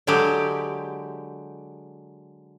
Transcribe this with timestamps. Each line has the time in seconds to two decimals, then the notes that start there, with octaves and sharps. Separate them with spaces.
0.07 D3 F#3 G#3 G4